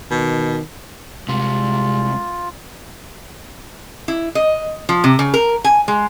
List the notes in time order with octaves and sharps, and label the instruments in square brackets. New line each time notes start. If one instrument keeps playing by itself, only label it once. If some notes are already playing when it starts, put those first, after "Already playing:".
[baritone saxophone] B2 [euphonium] D#3
[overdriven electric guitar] C2 C3 [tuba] G#3 [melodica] F4
[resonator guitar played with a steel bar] E4
D#5
F3
C3
C#3
A#4
G#5
G#3